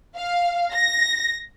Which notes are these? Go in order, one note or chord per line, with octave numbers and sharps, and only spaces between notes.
F5
A#6